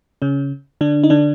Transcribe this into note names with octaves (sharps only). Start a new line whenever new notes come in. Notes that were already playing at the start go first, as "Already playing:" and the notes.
C#3 C#4
D3 D4
D#4
D3 D4